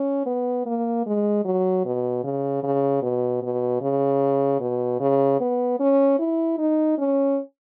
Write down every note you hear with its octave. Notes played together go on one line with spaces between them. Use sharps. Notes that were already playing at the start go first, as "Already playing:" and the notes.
Already playing: C#4
B3
A#3
G#3
F#3
B2
C#3
C#3
B2
B2
C#3
B2
C#3
B3
C#4
E4
D#4
C#4